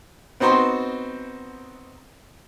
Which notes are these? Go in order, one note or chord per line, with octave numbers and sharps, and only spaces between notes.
B3 C4 D#4 F#4 C5